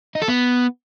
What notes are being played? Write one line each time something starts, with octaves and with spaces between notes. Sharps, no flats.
D#4
A4
B3